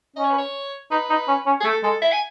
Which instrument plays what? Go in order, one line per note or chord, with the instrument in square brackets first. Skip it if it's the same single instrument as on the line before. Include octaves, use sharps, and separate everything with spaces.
[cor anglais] C#4 [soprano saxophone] D#5
[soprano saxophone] C#5
B4
C#5
[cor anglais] D#4 [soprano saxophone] B4
[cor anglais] D#4
C#4
C#4
[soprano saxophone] G#4
[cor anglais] A3 [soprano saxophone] A4
[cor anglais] G#3 [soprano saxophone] A4
[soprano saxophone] E5
G#5